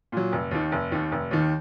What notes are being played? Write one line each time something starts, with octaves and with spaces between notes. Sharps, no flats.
A#2 F#3
F1
D#2 D#3
F1
D#2 D#3
F1
D#2 D#3